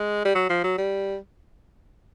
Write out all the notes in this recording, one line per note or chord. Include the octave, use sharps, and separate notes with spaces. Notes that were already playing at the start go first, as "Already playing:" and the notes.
Already playing: G#3
G3
F#3
F3
F#3
G3